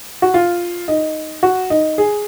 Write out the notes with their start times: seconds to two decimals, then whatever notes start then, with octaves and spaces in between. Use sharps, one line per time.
0.22 F#4
0.34 F4
0.88 D#4
1.43 F#4
1.70 D#4
1.98 G#4